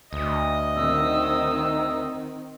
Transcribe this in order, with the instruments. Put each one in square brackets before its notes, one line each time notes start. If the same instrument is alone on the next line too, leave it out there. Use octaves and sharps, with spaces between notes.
[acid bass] D2 [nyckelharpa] D#5
[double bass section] D#3 C4 [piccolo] E6